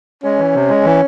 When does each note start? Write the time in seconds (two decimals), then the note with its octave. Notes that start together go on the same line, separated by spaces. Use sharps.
0.23 G#3 C#4
0.39 E3
0.55 C3
0.69 G#3
0.85 E3